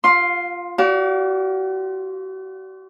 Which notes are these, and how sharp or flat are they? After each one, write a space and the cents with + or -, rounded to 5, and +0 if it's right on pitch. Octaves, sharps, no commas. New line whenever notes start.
F4 +0 F5 +35 C6 +5
F#4 +45 D5 -20 F5 +30